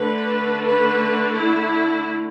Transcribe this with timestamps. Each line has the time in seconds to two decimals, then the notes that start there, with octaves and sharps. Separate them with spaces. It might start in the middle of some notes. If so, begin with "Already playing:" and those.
Already playing: D3 A3 D4 B4
0.63 B4
1.33 E4